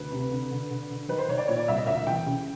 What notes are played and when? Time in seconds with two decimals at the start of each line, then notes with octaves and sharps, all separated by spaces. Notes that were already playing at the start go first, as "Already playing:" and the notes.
Already playing: D2 B4
0.12 C3
0.31 D3
0.51 D3
0.70 D3
0.90 D3
1.09 D#3 B4
1.19 C5
1.28 D#3 C#5
1.38 D5
1.48 A#2 C#5
1.58 D5
1.68 C2 E5
1.78 D#5
1.87 D2 E5
2.07 E3 G5
2.26 C#3